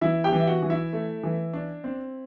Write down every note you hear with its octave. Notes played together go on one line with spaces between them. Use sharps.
E3 E4 E5
G4 G5
E3
E5
F#4 F#5
E3
E4 E5
A3
E3
D4
C4